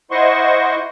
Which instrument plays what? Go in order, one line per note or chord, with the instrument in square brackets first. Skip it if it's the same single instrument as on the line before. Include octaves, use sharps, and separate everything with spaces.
[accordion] E4 C5 D#5 F#5 C6 C#6